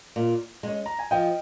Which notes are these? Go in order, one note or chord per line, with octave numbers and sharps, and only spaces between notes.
A#2
G#3 C#4
A#5
G#5
F3 D#5 G5